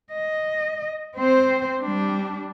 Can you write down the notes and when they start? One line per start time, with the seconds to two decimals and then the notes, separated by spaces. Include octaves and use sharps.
0.12 D#5
1.16 C4 C5
1.81 G3 D4